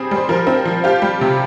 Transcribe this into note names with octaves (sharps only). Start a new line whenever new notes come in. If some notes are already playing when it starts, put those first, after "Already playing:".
Already playing: G3 C4 G#4
G3 C5
F3 A#4
C4
F3
F4 G4
G3
C3